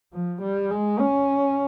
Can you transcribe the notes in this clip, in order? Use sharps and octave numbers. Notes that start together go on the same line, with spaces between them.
F3
G3
G#3
C#4